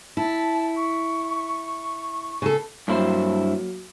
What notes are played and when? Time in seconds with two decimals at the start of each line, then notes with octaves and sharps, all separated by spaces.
0.17 E4 A5
0.76 C#6
2.42 C#3 A4
2.88 G2 F#3 A#3 E4 C5